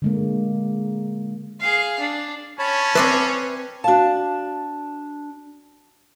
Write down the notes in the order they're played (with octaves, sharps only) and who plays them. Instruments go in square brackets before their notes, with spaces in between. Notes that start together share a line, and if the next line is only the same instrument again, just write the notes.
[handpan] D3 G#3 A#3
[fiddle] G#4 F5
D4
[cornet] C#4 [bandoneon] C#5 A5 B5
[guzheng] C4 D5 E5 [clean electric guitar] B4 C5
[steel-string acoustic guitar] D4 A5 [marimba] F#4 F5